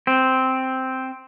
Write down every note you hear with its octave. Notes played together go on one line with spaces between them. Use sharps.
C4